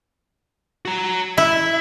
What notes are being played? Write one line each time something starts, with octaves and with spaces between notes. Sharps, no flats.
F#4 A#5
E4 E5